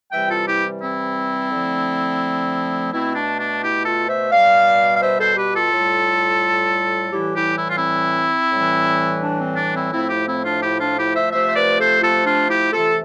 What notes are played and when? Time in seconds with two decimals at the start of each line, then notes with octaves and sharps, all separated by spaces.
0.11 C3 E3 G3 E5 G5
0.29 F4 A4
0.46 E4 G4
0.82 C4 E4
1.52 D3 F3 A3
2.92 B2 A3 C4 E4
3.15 D4
3.39 D4
3.62 E4 G4
3.86 F4 A4
4.08 C5 E5
4.31 B2 G3 D5 F5
4.95 F5
5.01 C5 E5
5.19 A4 C5
5.37 G4 B4
5.54 F4 A4
5.72 A2 G3
7.12 A2 E3 G3 E4 G4
7.36 E4 G4
7.58 E4
7.69 F4
7.77 C4 E4
8.52 A2 E3 G3
9.22 D4
9.39 C4
9.57 D4
9.75 C4 E4
9.92 A2 F3 A3 C4 E4
10.09 E4 G4
10.27 C4 E4
10.44 D4 F4
10.62 E4 G4
10.79 D4 F4
10.97 E4 G4
11.14 C5 E5
11.32 C3 F3 A3 C5 E5
11.48 C5
11.56 B4 D5
11.79 A4 C5
12.02 F4 A4
12.25 D4 F4
12.49 E4 G4
12.72 C3 E3 A3 F4 A4